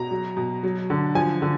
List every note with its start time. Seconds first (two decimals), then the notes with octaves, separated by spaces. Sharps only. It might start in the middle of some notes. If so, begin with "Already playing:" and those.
Already playing: B2 A#5
0.11 F#3
0.37 B2
0.63 F#3
0.90 D3
1.15 F3 G#5
1.42 D3